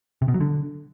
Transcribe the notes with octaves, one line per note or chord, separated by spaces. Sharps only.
C3
B2
F#3
D3